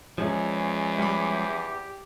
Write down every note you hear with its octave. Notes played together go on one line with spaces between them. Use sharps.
E2 F3 G#3 C#4
G3 G4 B5